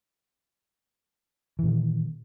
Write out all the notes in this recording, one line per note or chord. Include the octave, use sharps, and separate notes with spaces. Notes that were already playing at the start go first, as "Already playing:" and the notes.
A#2 D#3 E3